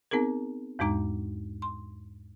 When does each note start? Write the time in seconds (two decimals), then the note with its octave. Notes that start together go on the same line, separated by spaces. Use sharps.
0.11 B3 C4 D#4 G#4 A#4
0.79 E2 G#2 G#3 D#4 A#5
1.62 C6